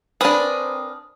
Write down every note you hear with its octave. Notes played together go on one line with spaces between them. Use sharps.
C4 D4 A#4 B4 G#5 D#6